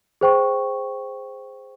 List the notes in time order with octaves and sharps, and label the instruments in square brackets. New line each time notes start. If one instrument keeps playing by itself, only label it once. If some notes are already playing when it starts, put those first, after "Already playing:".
[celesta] G#4 C5 G5 C#6